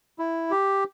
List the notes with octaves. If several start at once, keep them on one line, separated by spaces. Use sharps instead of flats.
E4
G4